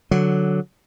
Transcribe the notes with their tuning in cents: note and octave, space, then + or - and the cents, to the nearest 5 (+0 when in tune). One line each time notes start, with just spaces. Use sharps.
D3 +0 F#3 +0